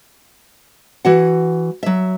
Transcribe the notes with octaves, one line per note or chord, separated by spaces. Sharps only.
E3 F#4 F#5
F#3 E5